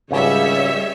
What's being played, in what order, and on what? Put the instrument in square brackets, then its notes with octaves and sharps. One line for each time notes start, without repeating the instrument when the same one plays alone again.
[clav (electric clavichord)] G#1 C#2 F#3 [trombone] C#3 [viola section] G3 C#5 E5